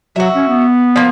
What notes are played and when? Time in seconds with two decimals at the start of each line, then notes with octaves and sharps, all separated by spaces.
0.16 F#3 F#4 E5
0.35 C#4
0.49 B3
0.96 F3 A#3